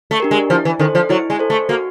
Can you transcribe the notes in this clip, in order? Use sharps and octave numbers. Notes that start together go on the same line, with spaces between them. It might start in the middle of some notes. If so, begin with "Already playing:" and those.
A3
D4 G4 A#4
G#3
F3 E4
E3
D#3 A4 C5
F3
F#3 E4
G#3
A4 C5
A3
A#3 F#4